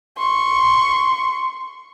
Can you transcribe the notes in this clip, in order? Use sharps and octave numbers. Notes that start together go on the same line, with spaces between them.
C6 C#6